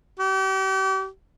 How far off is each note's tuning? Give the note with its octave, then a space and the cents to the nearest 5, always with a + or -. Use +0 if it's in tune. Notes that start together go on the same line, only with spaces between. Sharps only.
G4 -40